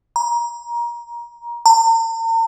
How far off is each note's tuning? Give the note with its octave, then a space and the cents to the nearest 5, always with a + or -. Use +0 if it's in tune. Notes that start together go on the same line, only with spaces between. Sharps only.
A#5 +25
A#5 -45